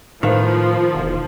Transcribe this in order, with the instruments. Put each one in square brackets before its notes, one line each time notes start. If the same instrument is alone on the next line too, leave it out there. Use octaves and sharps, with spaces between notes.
[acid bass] A2 [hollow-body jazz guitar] D#3 [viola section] F3 [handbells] B4 F5
[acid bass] E1